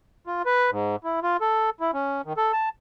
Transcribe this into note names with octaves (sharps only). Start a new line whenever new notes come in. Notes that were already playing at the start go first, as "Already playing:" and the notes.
F4
B4
G#2
E4
F4
A4
E4
C#4
D#3
A4
A5